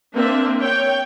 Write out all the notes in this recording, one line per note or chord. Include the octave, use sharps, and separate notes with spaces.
A#3 C4 D4 E5
C#5 G5